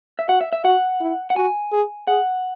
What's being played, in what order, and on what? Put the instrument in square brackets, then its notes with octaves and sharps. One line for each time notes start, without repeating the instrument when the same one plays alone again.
[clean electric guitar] E5
[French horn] F#4 [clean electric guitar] F#5
[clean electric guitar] E5
E5
[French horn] F#4 [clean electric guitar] F#5
[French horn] E4
[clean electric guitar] F#5
[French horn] F#4 [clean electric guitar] G#5
[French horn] G#4
[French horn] G#4 [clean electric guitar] F#5